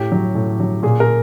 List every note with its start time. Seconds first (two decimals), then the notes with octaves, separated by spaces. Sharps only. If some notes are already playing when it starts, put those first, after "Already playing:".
Already playing: A2 G4
0.12 F#3
0.35 A2
0.60 F#3
0.83 A#2 G#4
1.00 A#4